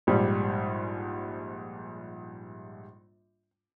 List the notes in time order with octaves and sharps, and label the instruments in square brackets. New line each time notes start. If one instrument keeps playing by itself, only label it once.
[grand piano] A#1 G#2 G3